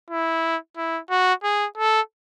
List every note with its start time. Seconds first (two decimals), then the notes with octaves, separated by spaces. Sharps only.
0.10 E4
0.77 E4
1.10 F#4
1.43 G#4
1.78 A4